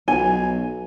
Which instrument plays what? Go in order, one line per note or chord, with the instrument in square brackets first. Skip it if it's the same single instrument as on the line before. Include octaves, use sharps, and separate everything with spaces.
[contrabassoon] B1 [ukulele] G#5